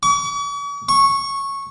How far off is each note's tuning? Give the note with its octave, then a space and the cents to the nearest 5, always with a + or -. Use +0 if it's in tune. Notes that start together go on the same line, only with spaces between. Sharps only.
C#6 +45
C#6 -10